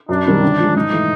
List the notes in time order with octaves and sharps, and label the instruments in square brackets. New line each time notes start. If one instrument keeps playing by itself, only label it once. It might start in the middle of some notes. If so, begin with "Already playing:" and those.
[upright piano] F#2 [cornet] D4
[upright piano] D#3 G3 C4 D#4
D3
F3 G#3
[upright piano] G#2 [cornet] D#4
[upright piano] E3 A3